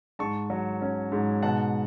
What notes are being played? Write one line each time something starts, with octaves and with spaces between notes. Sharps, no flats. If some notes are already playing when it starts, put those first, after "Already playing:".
G#2 A5 C#6
F#3
C#4
G#2
B2 F#5 A5